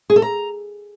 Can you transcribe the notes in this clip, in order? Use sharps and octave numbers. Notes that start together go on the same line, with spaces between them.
G#4
A4
A#5